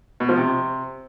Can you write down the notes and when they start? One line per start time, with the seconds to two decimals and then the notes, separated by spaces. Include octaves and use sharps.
0.20 B2
0.29 F3
0.37 C3